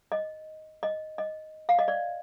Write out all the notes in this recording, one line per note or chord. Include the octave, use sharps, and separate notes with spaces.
D#5
D#5
D#5
F5
D#5
D5